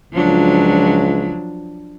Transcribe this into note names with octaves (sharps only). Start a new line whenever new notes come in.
C#2 F3 F#3 D4